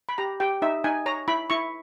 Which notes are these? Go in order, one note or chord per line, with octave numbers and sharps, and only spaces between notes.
B5
G4 A#5
G4 G5
D#4 E5
D#4 G#5
C#5 A#5
E4 B5
E4 C#6